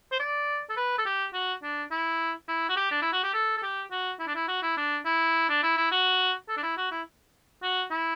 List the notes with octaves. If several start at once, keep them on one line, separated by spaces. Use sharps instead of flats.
C5
D5
A4
B4
A4
G4
F#4
D4
E4
E4
F#4
G4
D4
E4
F#4
G4
A4
A4
G4
F#4
E4
D4
E4
F#4
E4
D4
E4
D4
E4
E4
F#4
A4
D4
E4
F#4
E4
F#4
E4